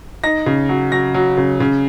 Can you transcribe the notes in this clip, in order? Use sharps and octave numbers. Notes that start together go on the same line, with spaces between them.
D#4 A#6
C#3
F#3
F#3 A#6
F#3
C#3
C#3